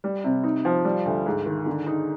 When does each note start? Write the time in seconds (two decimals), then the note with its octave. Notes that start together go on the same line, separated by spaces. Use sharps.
0.04 G3
0.24 C3
0.44 D#4
0.65 F3
0.85 G3
1.05 D2
1.26 G#2
1.46 D#3
1.66 D3
1.87 D#4